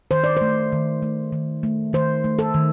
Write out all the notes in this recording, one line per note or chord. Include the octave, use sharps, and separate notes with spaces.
D#3 C5
D5
A3 C5
D#3
A3
D#3
A3
D#3 C5
A3
A4
D#3